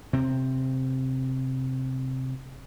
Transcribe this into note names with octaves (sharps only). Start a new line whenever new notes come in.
C3 C4